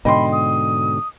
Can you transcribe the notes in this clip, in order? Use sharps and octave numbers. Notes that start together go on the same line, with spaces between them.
G#2 B2 D3 D#5 G5 B5 C6
D#6